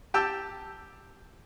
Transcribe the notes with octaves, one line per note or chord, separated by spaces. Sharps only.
G4 G5 A5 E6